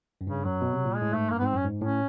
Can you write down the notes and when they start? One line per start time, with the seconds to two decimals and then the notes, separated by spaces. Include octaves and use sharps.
0.21 F#2
0.27 G2 C#3
0.45 F#2 F#3
0.61 B2
0.73 C3
0.85 A#2
0.96 G#3
1.02 A2
1.13 G#2 A3
1.30 G2 A#3
1.39 G#2 B3
1.47 C4
1.53 F#2 C#4
1.64 G#2
1.81 A2 C#4